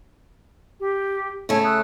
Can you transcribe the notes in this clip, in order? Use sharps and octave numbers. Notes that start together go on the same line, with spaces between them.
G4
C#3 A3 C#5 G#5
D#6 E6 F#6